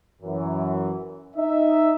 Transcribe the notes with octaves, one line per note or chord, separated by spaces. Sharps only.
F#2 E3
D#4 D#5 E5